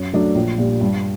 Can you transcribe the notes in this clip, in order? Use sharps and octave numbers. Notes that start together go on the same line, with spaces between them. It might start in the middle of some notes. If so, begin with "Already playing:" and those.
Already playing: F#2
F#3 A3 D4
A#1
A#2 G3
G2